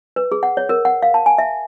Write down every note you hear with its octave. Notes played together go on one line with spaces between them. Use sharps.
B4
G#4
F#5
C#5
A#4
F#5
F5
A5
G#5
E5